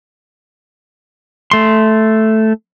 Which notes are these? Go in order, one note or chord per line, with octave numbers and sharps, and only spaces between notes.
A3 C6